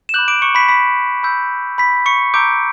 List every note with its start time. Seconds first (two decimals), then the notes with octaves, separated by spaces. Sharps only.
0.09 E7
0.14 B5 D6 F#6 G6 F#7
0.28 D6 D7
0.42 C#6 C#7
0.55 B5 B6
0.69 B5 B6
1.23 B5 E6 G6
1.78 B5 B6
2.06 C#6 C#7
2.34 A#5 C#6 D6 E6 G6 D7